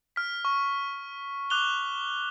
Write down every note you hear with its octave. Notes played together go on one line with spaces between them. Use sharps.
F6 B6
C#6
D6 F#6 F7 G7